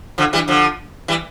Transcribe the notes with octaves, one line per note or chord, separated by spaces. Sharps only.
D3 F3
E3 G3
D3 F3
E3 G3